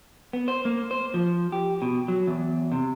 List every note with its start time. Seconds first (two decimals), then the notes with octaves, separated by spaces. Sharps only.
0.33 B3
0.48 C5
0.65 A#3
0.91 C5
1.14 F3
1.52 G4
1.82 B2
2.08 F#3
2.27 E2
2.72 C3